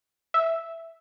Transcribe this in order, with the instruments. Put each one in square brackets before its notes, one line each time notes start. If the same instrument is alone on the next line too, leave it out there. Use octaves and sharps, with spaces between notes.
[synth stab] E5